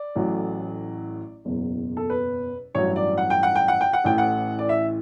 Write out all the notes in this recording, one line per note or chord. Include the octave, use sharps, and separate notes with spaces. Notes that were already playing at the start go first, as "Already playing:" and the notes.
Already playing: D5
A1 A2 F#3
F#1 E2 B2
A4
B4
A1 G2 F#3 C#5
D5
F#5
G5
F#5
G5
F#5
G5
F#5
A1 A2 E3 G5
F#5
D5
E5